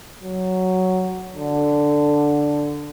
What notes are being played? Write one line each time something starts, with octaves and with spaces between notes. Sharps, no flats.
F#3
D3